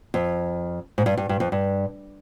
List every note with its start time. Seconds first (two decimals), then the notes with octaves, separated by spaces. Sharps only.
0.14 F2
0.98 G#2
1.06 G2
1.17 G2
1.29 G2
1.40 F2
1.52 G2